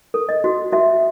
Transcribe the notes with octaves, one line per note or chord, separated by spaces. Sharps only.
A4
D#5
F#4
F#4 E5